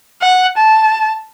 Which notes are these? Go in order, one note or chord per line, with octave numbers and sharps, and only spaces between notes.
F#5
A5